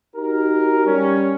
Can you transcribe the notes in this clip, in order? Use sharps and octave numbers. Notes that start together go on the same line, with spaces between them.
D#4 F#4 G4 A#4
G3 C#4